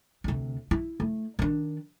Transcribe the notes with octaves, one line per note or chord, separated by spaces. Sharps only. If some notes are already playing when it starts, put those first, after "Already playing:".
D2 C3
E4
A3
D#3 D4